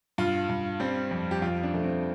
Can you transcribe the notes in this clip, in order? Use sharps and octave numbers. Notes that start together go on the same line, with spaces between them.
G2 F4
G2
G3 C4
F2
G4
F2 F4
D4
F2 A3
C4